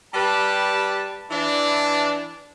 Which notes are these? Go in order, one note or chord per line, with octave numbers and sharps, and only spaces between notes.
G3 G4 B4 A5
E3 D4